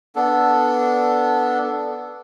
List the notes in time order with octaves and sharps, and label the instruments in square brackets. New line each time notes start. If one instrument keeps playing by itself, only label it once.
[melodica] B3 D4 A4